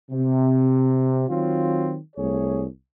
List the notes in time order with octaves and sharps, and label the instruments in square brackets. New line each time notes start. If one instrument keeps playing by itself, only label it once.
[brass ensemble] C3
D#3 F#3 C4 F4
C2 A3 G#4 C#5